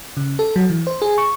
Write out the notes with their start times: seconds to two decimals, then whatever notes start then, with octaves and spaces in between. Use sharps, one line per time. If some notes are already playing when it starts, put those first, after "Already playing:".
0.17 C#3
0.39 A4
0.56 F#3
0.70 E3
0.87 C5
1.02 G#4
1.18 C#6